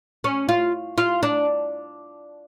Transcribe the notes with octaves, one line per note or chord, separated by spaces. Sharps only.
C#4
F4
F4
D4